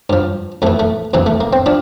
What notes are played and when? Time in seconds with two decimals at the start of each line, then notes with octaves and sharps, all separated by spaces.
0.10 G2 F3
0.62 F2 A3
0.67 E3
0.79 A3
1.13 F2 C3 E3 A#3
1.26 A3
1.41 A#3
1.53 C4
1.66 F3 D4